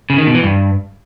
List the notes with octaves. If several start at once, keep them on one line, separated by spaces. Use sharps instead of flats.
C#3
D#3
B2
E3
G2